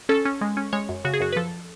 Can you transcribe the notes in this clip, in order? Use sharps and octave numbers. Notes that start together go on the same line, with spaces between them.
C#4 A4
C#4
G#3
C#4
G#3 C#5
F#2
C#3 F#4
G#4
F#2 F#4
B4
F3 A4